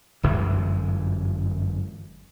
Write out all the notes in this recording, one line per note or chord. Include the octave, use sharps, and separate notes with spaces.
G1 F#2 E3 G#3